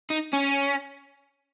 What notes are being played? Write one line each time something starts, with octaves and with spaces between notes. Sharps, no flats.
D#4
C#4